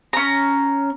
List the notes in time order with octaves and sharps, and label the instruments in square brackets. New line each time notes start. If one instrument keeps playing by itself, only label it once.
[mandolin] C#4 A#5